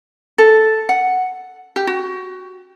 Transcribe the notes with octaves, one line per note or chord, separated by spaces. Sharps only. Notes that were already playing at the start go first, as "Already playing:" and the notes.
A4
F#5
G4
F#4